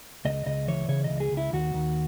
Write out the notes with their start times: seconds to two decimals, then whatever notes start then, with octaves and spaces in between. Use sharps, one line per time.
0.25 C#2 D#5
0.46 C#2 D#5
0.68 E3 C#5
0.88 C#3 C#5
1.04 D#5
1.10 C#2
1.20 G#4
1.32 C#2
1.37 E4
1.53 D#2 F#4
1.74 D#2